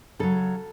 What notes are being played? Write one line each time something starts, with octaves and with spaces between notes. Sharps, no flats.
C#3 F#3 A4